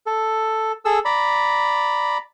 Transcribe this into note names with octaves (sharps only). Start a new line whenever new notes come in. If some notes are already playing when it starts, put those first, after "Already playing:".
A4
G#4 A4 E6
D5 A#5 B5